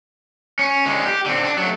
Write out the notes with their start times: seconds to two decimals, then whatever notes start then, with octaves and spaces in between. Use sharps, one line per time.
0.59 C#4
0.86 D3 G#3
1.05 G4
1.26 D3 C4
1.44 D4
1.58 F#3 A3